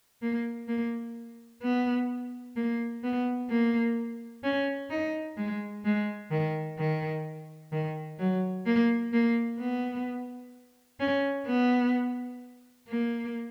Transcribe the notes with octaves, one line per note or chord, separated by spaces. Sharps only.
A#3
A#3
B3
A#3
B3
A#3
C#4
D#4
G#3
G#3
D#3
D#3
D#3
F#3
A#3
A#3
B3
C#4
B3
A#3